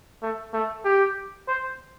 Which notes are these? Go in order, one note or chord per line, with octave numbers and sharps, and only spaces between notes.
A3
A3
G4
C5